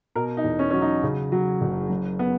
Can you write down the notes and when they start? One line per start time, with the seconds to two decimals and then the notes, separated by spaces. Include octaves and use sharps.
0.15 B2 A#4
0.37 D#4
0.44 E2
0.59 C#4
0.71 F#3 C#4
0.82 D#4
1.03 C#3
1.32 F#3
1.61 F#1
1.90 F#2
2.19 B3